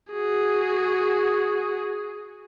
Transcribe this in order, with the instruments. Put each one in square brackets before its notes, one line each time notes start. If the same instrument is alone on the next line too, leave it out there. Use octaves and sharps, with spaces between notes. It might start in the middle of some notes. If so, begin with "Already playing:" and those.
[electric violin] F#4 G#4